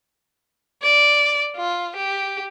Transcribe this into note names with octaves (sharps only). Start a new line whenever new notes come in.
D5
F4
G4